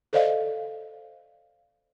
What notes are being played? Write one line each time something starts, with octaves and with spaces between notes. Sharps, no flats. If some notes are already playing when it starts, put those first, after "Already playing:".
A4 C5 D5 D#5 F5